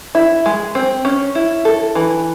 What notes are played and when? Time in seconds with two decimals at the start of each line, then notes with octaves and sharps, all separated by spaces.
0.15 E4
0.46 G#3
0.75 C4
1.05 C#4
1.35 E4
1.65 A4
1.95 E3